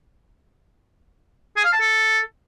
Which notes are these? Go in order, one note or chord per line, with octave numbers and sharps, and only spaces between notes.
G#4
F5
A5
A4